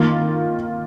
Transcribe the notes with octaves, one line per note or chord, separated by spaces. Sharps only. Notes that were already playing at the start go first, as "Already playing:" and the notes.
Already playing: D#3 A#3 F4